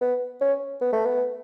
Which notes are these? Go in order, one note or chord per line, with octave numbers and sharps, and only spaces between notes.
B3
C#4
B3
A3
B3